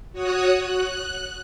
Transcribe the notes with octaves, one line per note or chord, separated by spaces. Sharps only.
F#4 C#5 D#6 F#6
F#6